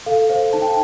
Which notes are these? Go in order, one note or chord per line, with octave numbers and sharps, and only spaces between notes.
A4 F5
C5 F5
D#4 A5
G5